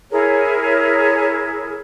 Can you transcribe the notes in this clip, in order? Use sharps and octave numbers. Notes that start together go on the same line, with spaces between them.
E4 G#4 A#4 C#5